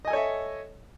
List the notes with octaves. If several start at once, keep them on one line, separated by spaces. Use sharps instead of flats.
A4 C#5 D#5 E5 G#5